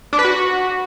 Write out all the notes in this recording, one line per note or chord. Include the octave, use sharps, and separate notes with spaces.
D4
B4
F#4